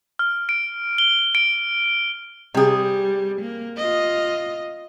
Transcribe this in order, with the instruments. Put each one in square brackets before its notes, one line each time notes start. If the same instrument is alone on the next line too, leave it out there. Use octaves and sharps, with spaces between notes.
[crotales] F6
D7
G7
D7
[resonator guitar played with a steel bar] C3 G#4 [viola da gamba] G3
[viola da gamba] A#3
F4 D#5